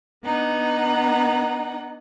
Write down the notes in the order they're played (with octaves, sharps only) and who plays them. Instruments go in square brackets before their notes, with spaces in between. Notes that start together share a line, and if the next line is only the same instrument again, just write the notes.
[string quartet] B3 D4 D#4 F#5